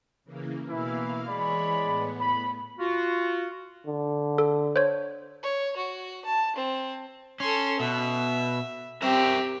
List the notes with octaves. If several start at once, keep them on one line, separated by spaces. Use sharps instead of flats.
C#3 E3 A#3
B2 E3 A#3 E4 F5
E3 G#3 C#5 D5 B5
A2 B3
B5
F4 F#4
D3
A4
C5 C#5
C#5
F#4
A5
C4
C#4 A4 C6
B2 E5
C4 G4 A#4 E5